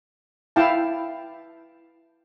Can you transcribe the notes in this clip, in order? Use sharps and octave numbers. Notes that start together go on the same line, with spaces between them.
E4 F5 G5 A5